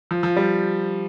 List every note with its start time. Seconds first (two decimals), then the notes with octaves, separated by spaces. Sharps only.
0.11 F3
0.23 F3
0.36 G3